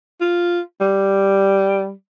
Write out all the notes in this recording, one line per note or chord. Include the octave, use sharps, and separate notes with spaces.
F4
G3